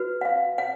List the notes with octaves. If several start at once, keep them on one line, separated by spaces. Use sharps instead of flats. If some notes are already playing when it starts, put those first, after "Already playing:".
Already playing: F#4 B4
F#5
F5
F#5